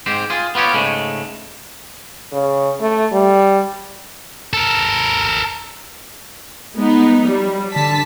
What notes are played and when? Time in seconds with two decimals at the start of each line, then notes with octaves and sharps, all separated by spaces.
0.06 G#2 C4 G4 C5
0.30 F4 G#4
0.55 B3 F4 G4 C#5
0.73 G#2 C#3 G#3 A3
2.33 C#3
2.81 A3
3.13 G3
4.53 A4 A#4
6.75 G#3 B3 D#4
7.26 F#3 G3
7.73 D3 A5 B6